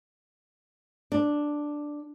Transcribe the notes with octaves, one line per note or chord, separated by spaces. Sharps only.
D4